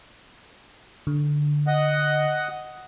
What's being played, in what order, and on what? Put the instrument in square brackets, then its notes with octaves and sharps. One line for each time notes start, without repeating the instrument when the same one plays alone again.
[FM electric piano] D3
[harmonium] D#5 F#5